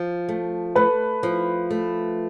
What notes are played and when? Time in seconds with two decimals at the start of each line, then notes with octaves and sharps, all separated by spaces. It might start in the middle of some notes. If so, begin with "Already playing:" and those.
Already playing: F3
0.29 A3
0.75 A3 B4
1.23 F3
1.71 A3